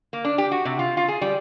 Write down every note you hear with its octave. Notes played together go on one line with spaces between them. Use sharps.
A#3
D4
G4
F#4
C3
F4
F4
G#4
G3